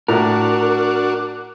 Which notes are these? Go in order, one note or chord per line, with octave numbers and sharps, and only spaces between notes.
A2 D4 F#4 A#4